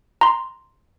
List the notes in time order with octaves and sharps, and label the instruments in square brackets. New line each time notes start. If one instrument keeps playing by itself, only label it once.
[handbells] A#5 C6